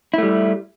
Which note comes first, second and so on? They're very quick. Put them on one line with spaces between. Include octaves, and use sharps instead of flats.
E4 A3 G3